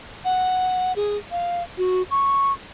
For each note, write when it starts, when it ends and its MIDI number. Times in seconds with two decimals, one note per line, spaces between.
0.25 0.93 78
0.96 1.17 68
1.31 1.63 77
1.78 2.02 66
2.11 2.53 85